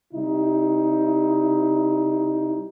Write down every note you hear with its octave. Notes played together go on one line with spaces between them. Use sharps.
C3 G3 D#4 E4